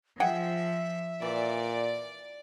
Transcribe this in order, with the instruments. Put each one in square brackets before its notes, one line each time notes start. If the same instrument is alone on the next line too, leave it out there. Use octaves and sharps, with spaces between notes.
[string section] F3 [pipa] G#4 F#5 G5 [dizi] E5
[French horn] A#2 [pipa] E3 [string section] D5